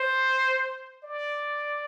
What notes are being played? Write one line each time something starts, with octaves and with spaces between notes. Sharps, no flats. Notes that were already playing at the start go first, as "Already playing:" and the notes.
Already playing: C5
D5